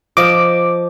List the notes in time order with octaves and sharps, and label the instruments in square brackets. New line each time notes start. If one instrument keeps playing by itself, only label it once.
[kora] F3 D#5 [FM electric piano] D6